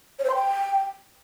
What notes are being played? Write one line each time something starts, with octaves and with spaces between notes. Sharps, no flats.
C#5
C5
C6
G5